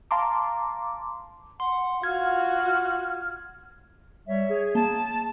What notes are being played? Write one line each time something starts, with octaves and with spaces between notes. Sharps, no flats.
F5 A5 A#5 C6 D6
F#5 C6
F4 F#4 F6 G#6
G3 C#5 E5
G#4
A#3 A5